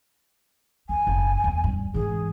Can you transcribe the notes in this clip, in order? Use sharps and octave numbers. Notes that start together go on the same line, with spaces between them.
D#2 G#5
F#1
E2 A#3
G2
G#2 E3 G#4